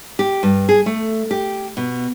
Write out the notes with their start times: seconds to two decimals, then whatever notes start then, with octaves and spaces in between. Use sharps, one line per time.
0.19 G4
0.43 G2
0.69 G#4
0.86 A3
1.31 G4
1.77 B2